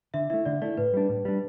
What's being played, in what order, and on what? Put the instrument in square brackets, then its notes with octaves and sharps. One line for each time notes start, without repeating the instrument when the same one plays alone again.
[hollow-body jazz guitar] D3 [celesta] E5
[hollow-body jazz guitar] A3 E4 [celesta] E5
[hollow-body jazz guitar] D3 [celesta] D5
[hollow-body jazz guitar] A3 E4 [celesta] D5
[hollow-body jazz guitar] A2 [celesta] B4
[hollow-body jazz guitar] G3 D4
A2
G3 D4